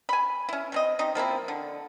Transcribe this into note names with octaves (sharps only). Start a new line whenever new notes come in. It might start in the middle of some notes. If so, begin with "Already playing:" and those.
G#5 B5
C#4 E4
A3 C4 D#5
C4 D#4 G4 D#5
F3 A#3 C4 E4
D3